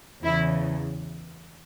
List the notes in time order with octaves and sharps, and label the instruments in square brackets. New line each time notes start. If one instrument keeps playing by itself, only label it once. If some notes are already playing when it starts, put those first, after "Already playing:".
[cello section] E2 C#3 E3 E4